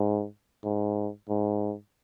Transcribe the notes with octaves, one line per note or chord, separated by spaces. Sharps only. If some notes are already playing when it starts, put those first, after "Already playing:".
Already playing: G#2
G#2
G#2